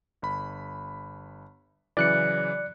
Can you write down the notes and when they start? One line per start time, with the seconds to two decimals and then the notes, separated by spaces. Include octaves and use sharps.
0.22 G1 B5
1.97 C#3 E3 F#3 D5 F#6 C#7